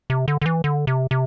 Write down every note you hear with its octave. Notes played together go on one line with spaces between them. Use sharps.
C3
D3
D3
E3
D3
C3
C3